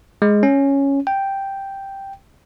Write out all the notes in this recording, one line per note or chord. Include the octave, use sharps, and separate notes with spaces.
G#3
C#4
G5